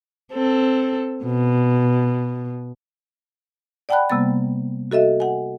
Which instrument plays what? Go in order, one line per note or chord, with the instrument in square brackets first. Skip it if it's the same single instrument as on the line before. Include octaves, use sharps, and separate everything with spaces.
[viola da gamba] C4 A4
B2
[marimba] D5 F#5 G5 A5 B5 F#6
C3 G3 A#3 B3 A6
F#4 A4 D#5 E5
F#5 G#5